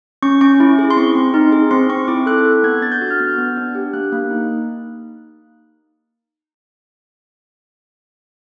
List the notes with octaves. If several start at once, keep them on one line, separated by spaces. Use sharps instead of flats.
C#4 C#6
C#4 C#6
E4
G#4
C6
C4 C#6
C4
D#4
G#4
C4 C6
C4 C#6
E4 D6
A4 F#6
A4
B3 G#6
D4 A6
G6
F#4
F6
B3 G6
B3
D4
G4
A#3 F#6
A#3
D#4